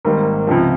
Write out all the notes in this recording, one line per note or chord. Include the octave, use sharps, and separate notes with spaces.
G#1 G#2 G3 A#3
C#2 C3 F3